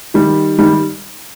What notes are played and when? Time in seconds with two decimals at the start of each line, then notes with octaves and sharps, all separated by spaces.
0.14 D#3 G3
0.59 D#3 G3